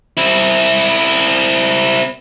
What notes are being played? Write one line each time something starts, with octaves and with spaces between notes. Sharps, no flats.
C4 E4